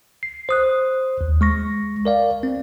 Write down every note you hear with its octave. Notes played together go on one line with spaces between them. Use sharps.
C7
C5 D#6 F#6
D#2
G#3 C#6 A#6
A#4 D5 F5
C4